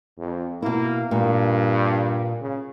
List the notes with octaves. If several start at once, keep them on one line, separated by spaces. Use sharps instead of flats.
F2
B2 A#3 E4
G2 A#2
C#3